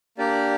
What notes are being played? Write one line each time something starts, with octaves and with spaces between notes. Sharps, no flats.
A#3 D4 G4 D5